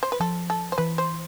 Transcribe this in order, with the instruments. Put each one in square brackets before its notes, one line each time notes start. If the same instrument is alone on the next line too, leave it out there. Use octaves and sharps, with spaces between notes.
[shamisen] C5
B4
[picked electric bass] F3 [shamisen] A4
[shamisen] A4
C5
[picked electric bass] E3 [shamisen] B4
[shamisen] C5